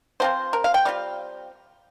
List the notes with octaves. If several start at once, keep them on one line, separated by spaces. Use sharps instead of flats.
F3 C4 F4 C5
A#4
F5
G5
G3 C4 F4 F5